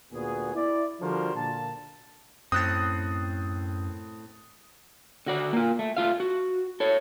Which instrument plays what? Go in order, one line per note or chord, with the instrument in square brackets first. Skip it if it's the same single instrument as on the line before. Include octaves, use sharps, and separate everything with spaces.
[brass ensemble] D2 A#2 B3 F#4 G#4
E4 D5
D3 F3 G3 F#4 A#4 C5
A#2 D3 A5
[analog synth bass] F#2 [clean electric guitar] A2 C4 [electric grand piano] D#6 F#6 A6
[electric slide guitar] D3 F#4 D5
A#3 F4
A3
A3 F4 F5
F#4
A4 C#5